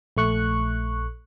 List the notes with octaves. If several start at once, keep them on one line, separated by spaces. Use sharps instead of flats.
A#1 A3 C#6 F#6